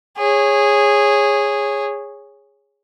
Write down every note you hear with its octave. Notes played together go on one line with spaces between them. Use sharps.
G#4 C#5